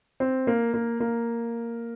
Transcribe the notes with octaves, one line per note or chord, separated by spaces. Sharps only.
C4
A#3
A#3
A#3